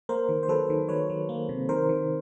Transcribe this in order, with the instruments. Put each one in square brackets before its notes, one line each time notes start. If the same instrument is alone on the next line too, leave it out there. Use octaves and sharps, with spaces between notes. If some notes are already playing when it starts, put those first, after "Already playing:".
[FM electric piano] A#3 A#4 C5
D#3
C5
F#3 A4 B4
D#3
F#3 B4 C#5
F#3
A#3
C3
D#3 A#4 C5
D#3